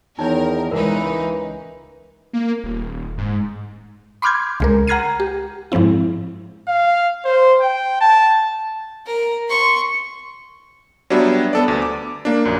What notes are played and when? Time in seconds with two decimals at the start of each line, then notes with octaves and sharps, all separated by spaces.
0.19 E2 D#3 D#4 A#4 C#5
0.71 C#2 E3 D#4 A#4 B4
2.33 A#3
2.64 D#1
3.18 G#2
4.22 B5 C6 D6 F6 G6 G#6
4.60 C#2 G#3 A#4
4.87 F#5 A#5 F6 G#6 C7 D#7
5.20 G4
5.72 G#2 F3 G#3 C4 E4
6.68 F5
7.25 C5
7.61 G5
8.01 A5
9.07 A#4
9.50 C6 C#6
11.10 F#3 G3 B3 D4 C#5 E5
11.53 B3 A4 D5
11.68 D2
11.82 D6
12.25 A#3 D4
12.45 A#1 F#2